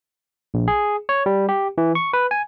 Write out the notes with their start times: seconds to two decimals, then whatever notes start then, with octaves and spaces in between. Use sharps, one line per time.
0.54 A#1
0.68 G#4
1.09 C#5
1.26 G3
1.49 G4
1.78 E3
1.95 C#6
2.13 B4
2.31 G#5